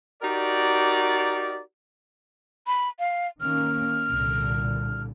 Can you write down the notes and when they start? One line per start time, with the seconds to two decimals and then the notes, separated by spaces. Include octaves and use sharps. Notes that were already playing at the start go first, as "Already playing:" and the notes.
0.22 D#4 F#4 G4 A#4 D5
2.67 B5
2.99 F5
3.41 D#3 A#3 C#4 F6
4.10 C2 A#2 D3